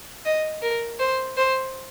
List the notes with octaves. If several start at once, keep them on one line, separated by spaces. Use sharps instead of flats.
D#5
A#4
C5
C5